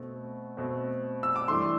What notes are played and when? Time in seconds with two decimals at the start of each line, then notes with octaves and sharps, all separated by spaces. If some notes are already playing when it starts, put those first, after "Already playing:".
Already playing: B2 A3 C4
0.57 B2 A3 C4
1.23 E6
1.36 D6
1.48 G2 E3 A3 D4 C6